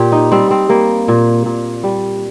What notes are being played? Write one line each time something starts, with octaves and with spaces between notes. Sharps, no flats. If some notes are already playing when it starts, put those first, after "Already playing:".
Already playing: A#2 G4
D#4
G3 C4
C4
G3 A#3
A#2
A#2
G3